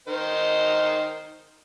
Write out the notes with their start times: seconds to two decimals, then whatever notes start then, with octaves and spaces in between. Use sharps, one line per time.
0.08 D#3 D#4 C5